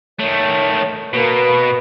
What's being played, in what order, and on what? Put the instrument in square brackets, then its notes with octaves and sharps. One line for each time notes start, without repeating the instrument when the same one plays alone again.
[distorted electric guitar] D#3 A3 [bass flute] C#5
[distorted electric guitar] B2 [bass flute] A#3 [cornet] B4